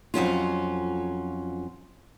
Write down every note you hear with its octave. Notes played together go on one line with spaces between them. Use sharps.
F2 F#3 C#4 F4